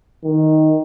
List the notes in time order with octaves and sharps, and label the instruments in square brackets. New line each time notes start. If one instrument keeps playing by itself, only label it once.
[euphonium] D#3